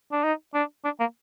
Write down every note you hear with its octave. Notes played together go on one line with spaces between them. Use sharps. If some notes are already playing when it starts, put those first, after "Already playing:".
D4
D#4
D4
D4
A#3